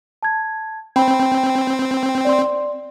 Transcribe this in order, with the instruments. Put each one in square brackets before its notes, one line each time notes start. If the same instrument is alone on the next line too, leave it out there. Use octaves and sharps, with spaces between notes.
[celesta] A5 G#6
[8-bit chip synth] C4 [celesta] G5 B5
[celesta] D5 C6